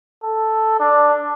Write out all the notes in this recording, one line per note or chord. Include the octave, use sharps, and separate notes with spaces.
A4
D4